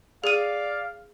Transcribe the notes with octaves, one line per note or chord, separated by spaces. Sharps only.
G#4 D5 F5 D#7